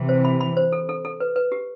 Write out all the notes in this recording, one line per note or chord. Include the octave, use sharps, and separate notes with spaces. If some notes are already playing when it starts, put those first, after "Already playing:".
Already playing: C3 E3
C5
B5
B5
C5
A4
A4
A4
B4
B4
G4